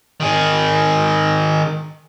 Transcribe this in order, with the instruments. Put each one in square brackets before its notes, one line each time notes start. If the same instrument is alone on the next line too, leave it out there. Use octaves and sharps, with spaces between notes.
[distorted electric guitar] D#3 G#4